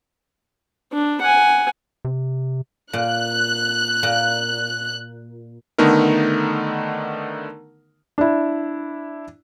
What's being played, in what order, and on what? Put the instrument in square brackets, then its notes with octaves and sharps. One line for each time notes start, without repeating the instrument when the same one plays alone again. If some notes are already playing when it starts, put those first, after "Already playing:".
[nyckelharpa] D4
F#5 G#5
[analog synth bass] C3
[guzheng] A#2 [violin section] F#6
[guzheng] A#2
[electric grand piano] D3 D#3 A3 B3 D#4 A#4
[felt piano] D4 E4